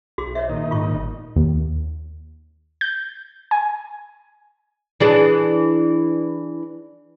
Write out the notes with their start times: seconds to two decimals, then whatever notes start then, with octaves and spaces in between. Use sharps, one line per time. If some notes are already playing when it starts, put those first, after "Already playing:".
0.18 B1 F#4 G#4 C6
0.35 C5 C#5 D#5 E5
0.50 A#2 D#3 D#4
0.71 G#2 F4 C#6
0.93 G1
1.36 D#2
2.81 G6
3.51 G#5
5.00 E3 D4 G#4